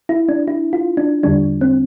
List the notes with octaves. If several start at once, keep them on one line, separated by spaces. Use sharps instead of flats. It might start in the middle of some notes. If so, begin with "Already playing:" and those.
E4
D4
E4
F4
D4
E2 D3 G3 D4
C4